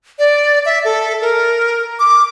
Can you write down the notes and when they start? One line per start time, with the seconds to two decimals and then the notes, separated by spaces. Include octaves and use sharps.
0.19 D5
0.65 E5
0.84 A4
1.21 A#4
1.99 D6